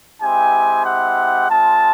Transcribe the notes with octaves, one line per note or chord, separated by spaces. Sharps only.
G#3 C4 E4 G4 G#5
F#5
G#3 C4 F4 A5